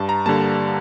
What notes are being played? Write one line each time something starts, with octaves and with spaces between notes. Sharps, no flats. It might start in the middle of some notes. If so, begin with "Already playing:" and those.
Already playing: G2 A5
A#5
D3 G3 A#3 A5